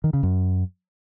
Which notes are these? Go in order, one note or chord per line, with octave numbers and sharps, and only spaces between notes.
D#3
C#3
F#2